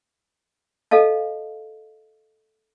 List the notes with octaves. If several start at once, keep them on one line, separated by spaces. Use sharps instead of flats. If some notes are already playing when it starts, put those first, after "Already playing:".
A4 D#5 F5 A5